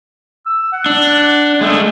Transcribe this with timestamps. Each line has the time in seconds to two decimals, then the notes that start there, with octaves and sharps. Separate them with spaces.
0.46 E6
0.72 F#5
0.86 D4
1.61 G#3 A3